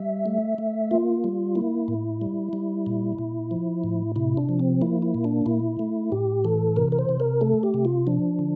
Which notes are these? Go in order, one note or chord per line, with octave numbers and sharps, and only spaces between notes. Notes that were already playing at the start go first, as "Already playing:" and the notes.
Already playing: G3 E5
A3
A3
A#3 F4
G3
A#3 E4
A2
G3
G3
A#2
A#2
F3
A2
C3 E4
D4
F3
C4
A#3 E4
E4
A#2
D4
A#2 E4
A3
A2 G4
E3 A4
C3 A#4
A#4
C5
C3
A#4
A3 A4
G4
C3
F4
F3 D4
D3